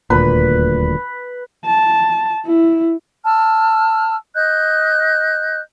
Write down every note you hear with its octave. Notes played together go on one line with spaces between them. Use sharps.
D#1 D2 A#2 B4
A5
E4
A5 E6 F6
D#5 F#6 G6